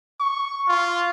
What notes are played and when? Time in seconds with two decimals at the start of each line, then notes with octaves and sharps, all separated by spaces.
0.20 C#6
0.68 F4